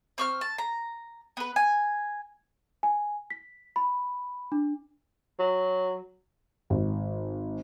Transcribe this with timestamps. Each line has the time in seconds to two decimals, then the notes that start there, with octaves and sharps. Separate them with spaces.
0.18 C4 C#6 F6
0.41 A5
0.58 A#5
1.37 B3 B4
1.56 G#5
2.83 G#5
3.30 B6
3.76 B5
4.52 D4
5.39 F#3
6.70 G#1